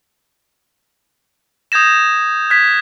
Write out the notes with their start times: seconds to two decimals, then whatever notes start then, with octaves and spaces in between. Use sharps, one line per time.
1.72 D#6 G6 G#6 A#6 E7
2.50 F#6 G#6 B6